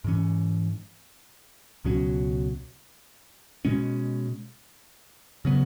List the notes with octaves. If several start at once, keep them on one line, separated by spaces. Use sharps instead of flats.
G#2 E3 C#4
C#2 B2 F#3 C#4
B2 G#3 C#4
C#3 F#3 B3